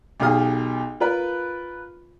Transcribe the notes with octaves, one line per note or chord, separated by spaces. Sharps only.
B1 B2 G4 G#4 F5 D#6
F4 A#4 B4 B5